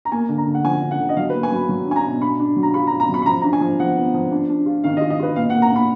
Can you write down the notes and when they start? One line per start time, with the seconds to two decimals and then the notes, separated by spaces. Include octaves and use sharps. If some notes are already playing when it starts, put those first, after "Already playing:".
0.05 A#5
0.12 A#3 G#5
0.29 D3
0.38 A#5
0.47 D3
0.54 F#5
0.64 F3 G#5
0.82 D3
0.91 F#5
0.99 D3
1.09 D#5
1.16 F#3 F5
1.30 B4
1.34 A#3
1.43 G#5
1.52 F#3 B5
1.69 F#3
1.87 D4 G#5
1.96 A#5
2.04 B2
2.21 D4 B5
2.40 D4
2.56 F#3
2.63 A#5
2.74 F4 B5
2.87 A#5
2.92 F4
3.00 A#5
3.09 F#3 B5
3.22 B5
3.26 F3 A#5
3.42 D4 A#5
3.53 G#5
3.61 F3
3.80 F3 F#5
3.96 B3
4.14 F3
4.31 D4
4.49 D4
4.66 F4
4.84 D#3 F5
4.97 D#5
5.01 F4
5.10 D#5
5.19 F4 B4
5.36 A#2 F5
5.50 F#5
5.54 A#3
5.62 A#5
5.72 A#2 B5